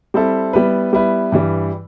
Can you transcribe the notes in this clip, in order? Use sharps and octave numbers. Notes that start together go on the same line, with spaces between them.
G3 C4 E4 A4
G3 B3 E4 B4
G3 B3 E4 B4
G2 E3 G3